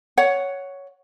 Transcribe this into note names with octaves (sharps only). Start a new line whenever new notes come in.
C#5 F#5